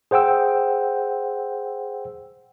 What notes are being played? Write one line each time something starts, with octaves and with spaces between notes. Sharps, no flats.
G#4 C5 F#5 G5 E6